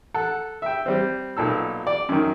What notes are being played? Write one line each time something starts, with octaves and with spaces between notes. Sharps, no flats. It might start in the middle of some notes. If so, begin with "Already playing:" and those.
A4 F#5
E5 G5
G3 C4
B1 A#2 A4 E6
D5
F#2 D#3